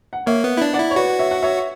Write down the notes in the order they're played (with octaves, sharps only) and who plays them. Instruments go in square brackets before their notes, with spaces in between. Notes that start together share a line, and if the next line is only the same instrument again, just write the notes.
[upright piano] F#5
[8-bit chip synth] A#3 [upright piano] C#5 E5
[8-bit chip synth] B3
E4
D4
[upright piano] D5 F#5
[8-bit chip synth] E4
[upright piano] C#5
[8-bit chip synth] F#4 [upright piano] B4 D5
[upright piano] C#5 E5
F#5
C#5 E5